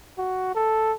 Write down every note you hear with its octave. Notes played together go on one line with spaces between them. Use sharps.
F#4
A4